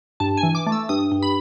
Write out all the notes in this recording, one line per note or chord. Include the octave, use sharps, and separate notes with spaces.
G2 A5
G#5
E3
D6
A3
E6
G2 D#6
G2
B5